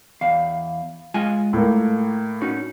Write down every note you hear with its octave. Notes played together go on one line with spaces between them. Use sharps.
E2 F5
G#3 F4 G#5
A2 A#3
C#4 D#4 F#4